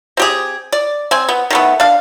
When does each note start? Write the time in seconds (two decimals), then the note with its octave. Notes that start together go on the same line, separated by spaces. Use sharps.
0.17 C4 G4 G#4
0.72 D5
1.11 C4 G#5
1.29 B3
1.50 D#3 A3 B3
1.80 D4 F5